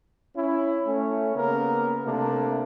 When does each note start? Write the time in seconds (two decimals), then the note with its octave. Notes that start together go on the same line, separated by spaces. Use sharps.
0.35 C#4 E4
0.85 A3 C#4
1.34 C#3 A#3 B3 A#4
2.04 C3 A3 A#3 D4